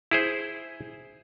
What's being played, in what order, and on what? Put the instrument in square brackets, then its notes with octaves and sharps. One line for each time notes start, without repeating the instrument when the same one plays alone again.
[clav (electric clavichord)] E4 G#4 C5